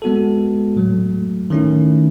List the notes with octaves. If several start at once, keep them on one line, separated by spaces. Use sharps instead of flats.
G#3 B3 F#4 A4
A2 F#3 A3
D#3 A3 C#4 E4